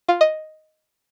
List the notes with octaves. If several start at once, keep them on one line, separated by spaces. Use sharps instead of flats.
F4
D#5